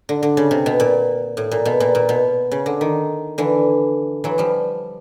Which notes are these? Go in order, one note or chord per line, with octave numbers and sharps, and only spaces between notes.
D3
D3
C#3
C3
B2
A#2
A2
A#2
B2
A#2
A#2
B2
C#3
D3
D#3
D3 E3
E3 F#3
F3 G3